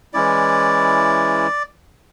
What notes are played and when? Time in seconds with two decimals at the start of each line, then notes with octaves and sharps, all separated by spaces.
0.13 E3 G#3 C#4 E4 D5